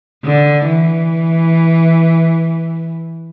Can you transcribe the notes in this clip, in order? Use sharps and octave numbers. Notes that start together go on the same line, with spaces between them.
D3
E3